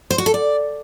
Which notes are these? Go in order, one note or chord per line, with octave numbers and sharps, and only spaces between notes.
C5
F#4
A4
D5